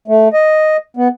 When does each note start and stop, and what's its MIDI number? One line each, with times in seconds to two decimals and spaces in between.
0.08 0.28 57
0.33 0.77 75
0.97 1.08 59